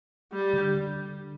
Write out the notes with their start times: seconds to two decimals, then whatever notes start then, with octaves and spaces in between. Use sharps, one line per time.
0.32 G3
0.53 D3
0.75 D3